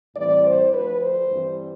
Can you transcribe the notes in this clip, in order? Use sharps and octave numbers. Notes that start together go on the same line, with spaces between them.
A2 E3 G3 C4 D5
C5
D2 D3 F3 B4
C5
G2 E3 G3 C4